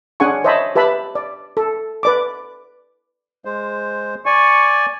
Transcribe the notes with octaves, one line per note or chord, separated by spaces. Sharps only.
C#4 D4 G#4 F#5 G#5 C#6
C5 C#5 D#5 E5 A5 B5
G4 B4 E5 A5 B5
D5
A4
B4 D5 D6
G#3 C5
D5 G#5 C#6